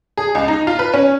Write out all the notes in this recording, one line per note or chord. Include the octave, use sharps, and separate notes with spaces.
G#4
C#2
D#4
F4
B4
C#4